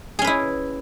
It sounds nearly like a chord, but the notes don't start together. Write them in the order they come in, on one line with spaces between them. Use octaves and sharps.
G#4 C#4 B4 E4